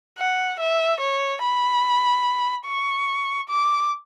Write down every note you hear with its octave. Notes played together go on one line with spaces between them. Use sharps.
F#5
E5
C#5
B5
C#6
D6